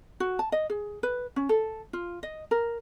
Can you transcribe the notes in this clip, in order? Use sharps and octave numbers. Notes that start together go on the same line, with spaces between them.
F#4
A5
D#5
G#4
B4
C#4
A4
F4
D#5
A#4